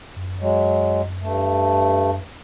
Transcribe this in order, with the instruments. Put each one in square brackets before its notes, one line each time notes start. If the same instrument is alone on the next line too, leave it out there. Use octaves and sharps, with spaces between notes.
[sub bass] F#2
[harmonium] F#3 G#3
G2 A3